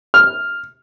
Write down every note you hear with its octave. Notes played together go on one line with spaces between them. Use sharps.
F6